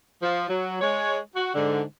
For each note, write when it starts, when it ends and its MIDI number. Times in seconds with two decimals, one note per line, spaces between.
0.22 0.48 53
0.50 0.79 54
0.81 1.18 56
0.81 1.18 73
1.35 1.51 66
1.55 1.83 44
1.55 1.83 50